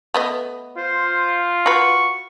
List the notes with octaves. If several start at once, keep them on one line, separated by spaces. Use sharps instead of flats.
A3 B3 D#5
F4 C5
F#4 B4 C#6